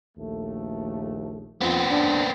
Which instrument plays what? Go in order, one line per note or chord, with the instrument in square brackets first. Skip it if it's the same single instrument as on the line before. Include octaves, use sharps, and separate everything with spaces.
[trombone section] A#1 D#2 A3
[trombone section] F2 F3 [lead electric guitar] B3 C4
[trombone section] D4